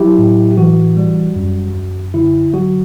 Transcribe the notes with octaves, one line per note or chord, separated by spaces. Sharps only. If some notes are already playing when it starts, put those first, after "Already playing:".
Already playing: F#3 E4 G4
A2
E3 F#4
G3
F#2
F#2
D3 E4
F#3 F#4